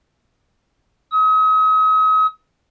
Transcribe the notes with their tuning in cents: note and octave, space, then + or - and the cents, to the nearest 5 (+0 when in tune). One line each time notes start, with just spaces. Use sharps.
D#6 +40